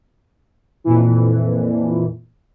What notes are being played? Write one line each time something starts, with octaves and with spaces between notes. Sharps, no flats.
F2 A#2 E3